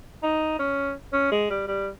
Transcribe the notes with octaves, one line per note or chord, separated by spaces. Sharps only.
D#4
C#4
C#4
G#3
G3
G3